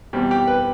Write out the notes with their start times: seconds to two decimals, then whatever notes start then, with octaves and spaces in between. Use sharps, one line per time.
0.13 E2 B2 G3 C4
0.31 G4
0.47 B4